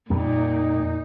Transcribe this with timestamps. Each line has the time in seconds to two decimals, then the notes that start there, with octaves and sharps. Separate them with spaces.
0.10 F2 A#2 G3 A#3 D#4